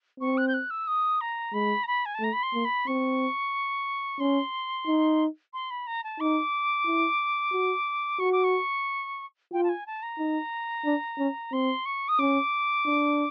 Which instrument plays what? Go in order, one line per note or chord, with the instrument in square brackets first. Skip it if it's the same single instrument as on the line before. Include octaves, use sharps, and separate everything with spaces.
[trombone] C4 [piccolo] C#6
[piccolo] F#6
G6
F#6
E6
D#6
A#5
[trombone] G#3 [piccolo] B5
[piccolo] A#5
B5
G#5
A5
[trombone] A3 [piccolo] A#5
[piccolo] B5
C6
[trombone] A#3
[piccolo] B5
[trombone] C4 [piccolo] C#6
[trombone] C#4 [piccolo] C6
[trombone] D#4
[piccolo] C6
B5
A#5
A5
[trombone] D#4 [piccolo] D6
[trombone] E4
F#4
[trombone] F#4 [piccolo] C#6
[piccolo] D6
C#6
[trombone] F4 [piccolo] G5
[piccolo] A5
G#5
A5
A#5
[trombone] D#4
D4
C#4
[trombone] C4 [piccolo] C6
[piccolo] C#6
D#6
[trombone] C#4 [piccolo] D6
[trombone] D4